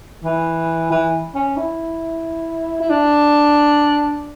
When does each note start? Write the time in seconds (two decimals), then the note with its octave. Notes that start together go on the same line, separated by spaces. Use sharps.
0.24 E3
0.91 E3
1.35 C#4
1.57 E4
2.80 E4
2.90 D4